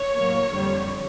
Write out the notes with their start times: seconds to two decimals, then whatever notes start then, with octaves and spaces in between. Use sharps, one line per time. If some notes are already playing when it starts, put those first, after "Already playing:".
Already playing: C#5
0.16 A2 F#3 A#3
0.50 F2 D3 G3